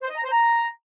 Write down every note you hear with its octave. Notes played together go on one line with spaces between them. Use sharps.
C5
D#5
A#5
C5
A#5